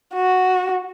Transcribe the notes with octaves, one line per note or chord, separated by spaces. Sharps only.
F#4